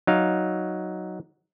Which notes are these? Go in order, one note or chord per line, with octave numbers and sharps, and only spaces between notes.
F#3 D#4 F5